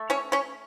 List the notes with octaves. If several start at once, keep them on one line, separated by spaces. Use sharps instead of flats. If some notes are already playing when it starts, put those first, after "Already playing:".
Already playing: A3
C#4 C#5
C#4 C#5